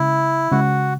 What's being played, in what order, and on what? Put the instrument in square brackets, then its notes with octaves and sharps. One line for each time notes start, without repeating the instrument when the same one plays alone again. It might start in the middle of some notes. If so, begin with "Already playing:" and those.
Already playing: [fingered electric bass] C#3 G#3 C#4 [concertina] E4
[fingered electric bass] C#3 G#3 C#4 [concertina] F#4